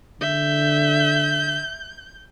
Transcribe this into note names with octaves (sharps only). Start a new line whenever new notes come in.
D3 E5 G6